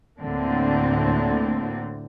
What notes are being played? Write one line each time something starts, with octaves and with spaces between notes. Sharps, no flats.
D2 A2 D3 A#3 C4 D4